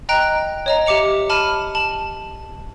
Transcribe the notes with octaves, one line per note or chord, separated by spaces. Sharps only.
D#5 G5 A#5 F#6 D7
C#5 D#5 A#5
G4 E5 D6 C#7 F7
A5 B5 F6 D#7
A5 F#7